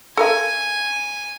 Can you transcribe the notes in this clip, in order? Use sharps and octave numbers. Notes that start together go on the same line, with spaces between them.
A4 A#4 F5 G#5